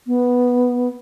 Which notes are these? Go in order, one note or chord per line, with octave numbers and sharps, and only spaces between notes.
B3